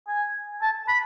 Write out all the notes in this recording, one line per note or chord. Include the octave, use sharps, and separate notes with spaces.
G#5
A5
B5